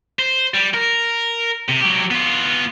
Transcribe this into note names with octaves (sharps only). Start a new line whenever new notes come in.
C5
G3
A#4
C3
F#3 G4
B3 F4